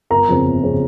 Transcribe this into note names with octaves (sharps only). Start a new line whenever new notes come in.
G1 A#4 A#5
F2 C#3 F3 C4
G1
C#3 F3 C4